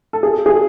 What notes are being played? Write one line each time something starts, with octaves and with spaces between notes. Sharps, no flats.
A4
G#4
G#4